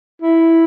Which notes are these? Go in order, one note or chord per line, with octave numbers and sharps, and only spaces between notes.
E4